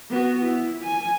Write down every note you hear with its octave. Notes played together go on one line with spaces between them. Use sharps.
B3 F#4
E4
G#5